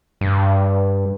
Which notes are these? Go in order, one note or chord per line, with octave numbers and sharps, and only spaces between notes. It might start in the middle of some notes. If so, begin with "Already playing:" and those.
G2